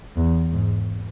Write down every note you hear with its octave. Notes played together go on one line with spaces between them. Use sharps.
E2
G#2